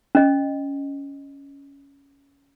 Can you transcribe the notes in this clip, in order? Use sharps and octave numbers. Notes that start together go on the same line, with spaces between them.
C#4 D#5